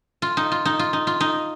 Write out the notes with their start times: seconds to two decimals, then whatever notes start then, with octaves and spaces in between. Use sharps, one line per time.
0.22 F4
0.37 D#4
0.52 F4
0.65 D#4
0.79 F4
0.93 D#4
1.07 F4
1.20 D#4